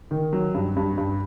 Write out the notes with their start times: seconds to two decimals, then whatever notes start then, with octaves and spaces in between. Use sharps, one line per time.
0.11 D#3
0.33 F#3
0.54 G2
0.76 G2
0.98 G2